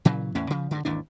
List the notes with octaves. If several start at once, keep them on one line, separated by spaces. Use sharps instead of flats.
A#2 C#3 E3 F#3
E2 A2 C#4
C#3 F3
G2 D3
G#1 D#2 E3 D4